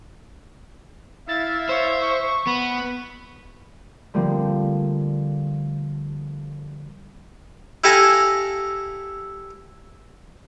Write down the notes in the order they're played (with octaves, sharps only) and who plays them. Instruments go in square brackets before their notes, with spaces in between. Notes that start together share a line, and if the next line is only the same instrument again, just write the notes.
[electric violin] E4 F5 [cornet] E5 [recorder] A6
[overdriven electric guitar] C5 [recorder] C#5
[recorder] C#6
[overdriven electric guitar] B3 [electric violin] B5
[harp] D3 F3 G3 A3 A#3 C4
[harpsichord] E4 G4 A4 F5 G#5 A#5